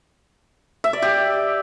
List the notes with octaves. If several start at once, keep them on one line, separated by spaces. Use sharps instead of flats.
E5
D5
G4